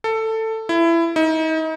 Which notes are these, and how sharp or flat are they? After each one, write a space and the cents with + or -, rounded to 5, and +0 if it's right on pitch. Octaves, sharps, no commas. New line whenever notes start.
A4 +15
E4 +20
D#4 +35